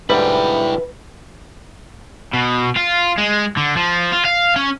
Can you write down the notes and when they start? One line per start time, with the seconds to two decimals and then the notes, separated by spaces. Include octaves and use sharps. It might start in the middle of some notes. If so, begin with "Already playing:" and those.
0.10 D2 G#2 G3 E4 B4 G5
2.34 B2
2.77 F4
3.18 G#3
3.57 D3
3.77 F3
4.12 F4
4.25 F5
4.56 C#4